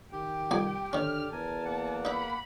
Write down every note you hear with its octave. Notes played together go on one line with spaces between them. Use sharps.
D#3 G4 G5
C2 F2 G#5
D3 D#3 C#4 F6
E2 A#4 G#5 A5
A#3 F#5
D#4 E5 B5